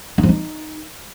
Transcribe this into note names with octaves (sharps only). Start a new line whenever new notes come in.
D#4
F3
D#4